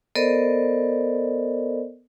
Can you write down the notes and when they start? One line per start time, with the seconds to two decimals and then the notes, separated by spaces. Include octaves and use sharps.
0.16 B3 A4 A#4 C5 D5 D#5